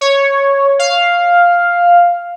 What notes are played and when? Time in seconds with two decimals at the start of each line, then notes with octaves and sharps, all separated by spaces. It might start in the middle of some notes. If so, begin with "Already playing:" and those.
0.01 C#5
0.79 F5